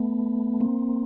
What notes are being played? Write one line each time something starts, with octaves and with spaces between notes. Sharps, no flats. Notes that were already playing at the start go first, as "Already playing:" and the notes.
Already playing: A3 B3
A#3 C4